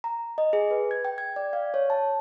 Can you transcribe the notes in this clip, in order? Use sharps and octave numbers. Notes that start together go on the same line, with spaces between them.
A#5
D#5
G#4
B4
G#6
G5
G#6
D5
F5
C#5
A5